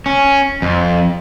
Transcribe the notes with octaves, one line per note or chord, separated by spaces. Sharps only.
C#4
F2